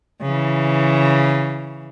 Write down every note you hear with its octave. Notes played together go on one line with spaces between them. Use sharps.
C#3 E3